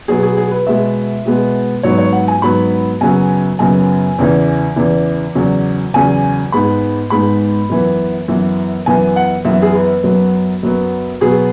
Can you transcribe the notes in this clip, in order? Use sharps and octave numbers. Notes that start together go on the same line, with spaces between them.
B2 F#3 B3 G#4
G#4
G#4
B4
B2 G#3 B3 E5
B2 G#3 B3
G#2 F#3 B3 C#5
C#5
F#5
G#5
G#2 F#3 B3 B5
F#2 C#3 F#3 B3 G#5
F#2 C#3 F#3 B3 G#5
E2 C#3 E3
E2 C#3 E3
E2 C#3 F#3
E2 C#3 F#3 G#5
G#2 G#3 B3 B5
G#2 G#3 B3 B5
F#2 E3 B3
F#2 E3 B3
F#2 E3 B3 G#5
F#5
F#2 E3 B3 E5
G#4
B4
F#2 F#3 B3
F#2 F#3 B3
B2 F#3 B3 G#4